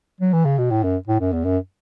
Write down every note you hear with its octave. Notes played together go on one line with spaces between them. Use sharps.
F#3
E3
C#3
B2
A2
F#2
A2
F#2
E2
F#2